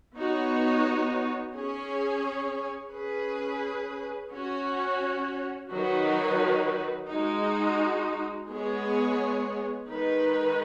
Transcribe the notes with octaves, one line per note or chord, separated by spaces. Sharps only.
B3 D#4 F#4 C#5
C#4 G#4 C#5
C#4 G#4 B4
C#4 F#4 C#5
D#3 F#3 D#4 F#4 B4
G#3 D#4 F#4
G#3 B3 G#4 C#5
D#3 G#3 D#4 B4